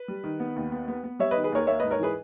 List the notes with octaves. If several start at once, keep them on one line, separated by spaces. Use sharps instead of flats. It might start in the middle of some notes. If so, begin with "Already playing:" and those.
Already playing: B4
G3
D#3
B3
D#2
B3
B3
B3
G3 C#5 E5
D#3 B4 D#5
G#4 B4
D#2 A#4 C#5
A#3 C#5 E5
G#2 B4 D#5
A#4 C#5
E3 G#4 B4